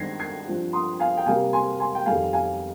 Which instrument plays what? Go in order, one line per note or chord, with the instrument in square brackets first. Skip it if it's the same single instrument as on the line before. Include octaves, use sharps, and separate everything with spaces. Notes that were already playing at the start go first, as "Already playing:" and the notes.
Already playing: [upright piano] G2 D#3 G#3 C4 G#6 A#6 C7
G#6 C7
G2 F3 C4
C6 D#6
F5 G#5
G5
C3 G3 A#3 F5 G#5
G#5 C6
G#5 C6
G5
F2 D#3 G3 F5 G#5
F5 G#5